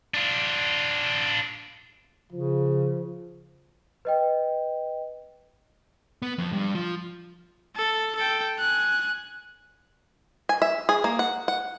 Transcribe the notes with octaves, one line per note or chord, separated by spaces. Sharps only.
D4 F4
C#3 F3
B4 D#5 G5
B3
F2
G2
F3
A4
A4 G5
G#5 F#6
G#5
E5
G#4
A#3
F#5
F#5